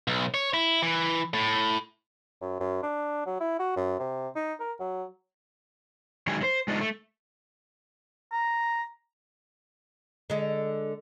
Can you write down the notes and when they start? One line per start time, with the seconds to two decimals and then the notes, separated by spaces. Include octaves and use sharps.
0.08 B1
0.34 C#5
0.54 E4
0.83 E3
1.34 A2
2.41 F#2
2.60 F#2
2.82 D4
3.26 F#3
3.40 E4
3.59 F#4
3.76 F#2
3.99 C3
4.35 D#4
4.60 A#4
4.80 F#3
6.27 D#3 F#3 G#3 D#4 G4 G#5
6.41 F#3 C5
6.68 G#3 D4 D#4 F4 D#5
6.81 A3
8.32 A#5
10.30 D3 G#3